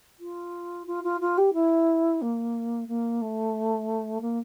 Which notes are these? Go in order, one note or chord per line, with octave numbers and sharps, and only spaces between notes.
F4
F4
F4
F4
G4
E4
A#3
A#3
A3
A#3